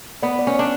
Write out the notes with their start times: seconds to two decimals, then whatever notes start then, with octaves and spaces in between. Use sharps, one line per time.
0.23 B3 D5
0.39 D5
0.47 C#4
0.54 D5
0.59 D4